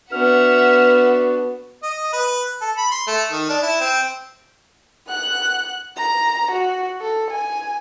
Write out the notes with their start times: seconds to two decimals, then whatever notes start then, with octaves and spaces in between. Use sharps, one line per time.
0.12 B3 D4 F#4 E5 F#5 F6
1.83 D#5
2.13 B4
2.61 A4
2.77 B5
2.92 C6
3.07 A3
3.31 D#3
3.49 D4
3.62 E4
3.80 C4
5.08 F#5 F#6
5.96 A#5
6.51 F#4
7.01 A4
7.31 G#5